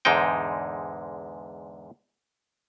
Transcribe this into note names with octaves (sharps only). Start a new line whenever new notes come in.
E2 G#2 D3 G#3 D#4 G5